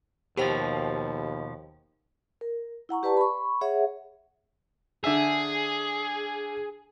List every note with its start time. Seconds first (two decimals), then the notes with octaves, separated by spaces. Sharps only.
0.37 D#2 B2 F3 G4 C5 G5
2.41 A#4
2.89 E4 F#5 A#5 C#6
3.03 G4 B4 D5 A5
3.17 B5 C#6
3.61 G#4 C#5 E5 F#5
5.04 D3 G#4 E5 E6